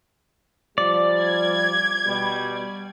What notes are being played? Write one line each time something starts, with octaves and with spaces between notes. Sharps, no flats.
F3 G3 D5
G#6
B2 G3